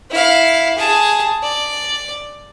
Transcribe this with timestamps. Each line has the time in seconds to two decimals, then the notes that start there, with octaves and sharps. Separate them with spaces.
0.11 E4 F5
0.78 G#4 A5
1.43 D5